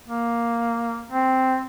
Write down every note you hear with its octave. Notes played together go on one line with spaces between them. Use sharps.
A#3
C4